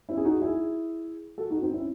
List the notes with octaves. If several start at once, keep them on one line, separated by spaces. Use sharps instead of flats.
C#4 E4
G#4
D#4 F#4
E4 G#4
F#4 A4
D#4 F#4
C4 D#4
C#4 E4